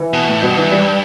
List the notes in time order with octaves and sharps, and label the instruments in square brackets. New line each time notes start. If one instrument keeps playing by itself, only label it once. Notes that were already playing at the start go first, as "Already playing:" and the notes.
Already playing: [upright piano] E3
[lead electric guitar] B2
A2
[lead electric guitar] G2 [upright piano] B2
[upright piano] E3
G3